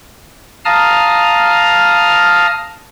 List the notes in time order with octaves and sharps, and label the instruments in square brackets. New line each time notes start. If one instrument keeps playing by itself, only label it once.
[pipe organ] F5 A5 A#5 D#6 F6